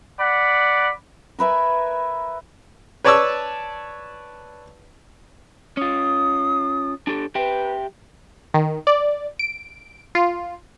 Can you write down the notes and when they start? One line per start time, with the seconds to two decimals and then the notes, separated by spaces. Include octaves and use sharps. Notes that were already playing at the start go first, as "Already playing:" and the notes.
0.19 D5 F#5 B5
1.39 A#4 B4 E5 G#5
3.04 B4 C#5 D5 A5 C#6 E6
5.77 C#4 F4 D#6
7.07 D4 G4 A4
7.35 G4 B4 E5 G5
8.54 D#3
8.87 D5
9.39 D7
10.15 F4